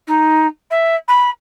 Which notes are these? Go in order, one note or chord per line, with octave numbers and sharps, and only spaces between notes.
D#4
E5
B5